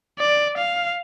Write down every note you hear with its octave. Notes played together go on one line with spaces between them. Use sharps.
D5
F5